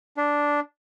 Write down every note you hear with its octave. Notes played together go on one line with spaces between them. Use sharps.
D4